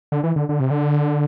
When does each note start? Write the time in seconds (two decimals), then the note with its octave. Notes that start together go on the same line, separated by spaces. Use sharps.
0.12 D3
0.24 E3
0.36 D3
0.49 D3
0.60 C3
0.71 D3